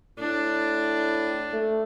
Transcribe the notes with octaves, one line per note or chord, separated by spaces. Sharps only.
A2 D4
A3